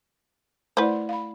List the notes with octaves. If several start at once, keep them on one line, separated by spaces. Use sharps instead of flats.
A3 E4 B4 C5 D5
F5 B5